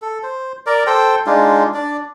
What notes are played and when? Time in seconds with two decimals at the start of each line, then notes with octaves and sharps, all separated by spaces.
0.02 A4
0.23 C5
0.66 A#4 D5
0.87 A4 C5 G5
1.26 G#3 D4 D#4 F4
1.74 D4 D5